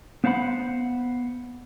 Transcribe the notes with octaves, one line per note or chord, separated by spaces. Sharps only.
B3 C5 F5 F#5 B5